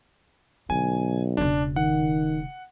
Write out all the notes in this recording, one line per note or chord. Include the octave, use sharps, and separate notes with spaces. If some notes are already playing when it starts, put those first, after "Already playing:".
B1 D3 G#5
E1 C#3 D4
D#3 F#5